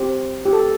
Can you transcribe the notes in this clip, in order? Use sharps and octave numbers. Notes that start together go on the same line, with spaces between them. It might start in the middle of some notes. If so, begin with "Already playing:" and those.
Already playing: C4 G4
G4
A4